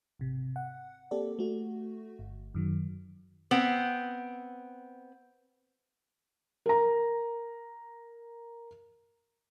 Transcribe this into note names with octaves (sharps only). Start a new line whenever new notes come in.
G#1 C3
F#5
A#3 C4 G4 A4 D5
A3 F#4
G1
F#2 D#3 F#3
B3 C4
A#4 A#5